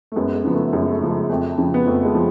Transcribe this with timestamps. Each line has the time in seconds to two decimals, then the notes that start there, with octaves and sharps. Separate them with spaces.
0.12 A3
0.16 F#2 G#3 B3
0.35 G#3
0.44 C#3 F3 B3
0.54 A3
0.73 F#2 G#3
0.91 A3
1.01 C#3 F3
1.10 G#3
1.30 F2 A3
1.58 C#3 F3
1.74 B3
1.86 F2 A3
2.05 G#3
2.15 F3